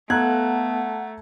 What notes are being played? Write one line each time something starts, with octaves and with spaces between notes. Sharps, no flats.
A3 B3 A4 F#5 A#5 F#6 G#6